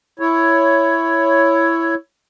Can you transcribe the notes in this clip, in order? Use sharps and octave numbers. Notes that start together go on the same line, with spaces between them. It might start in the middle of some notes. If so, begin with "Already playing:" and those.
E4 C#5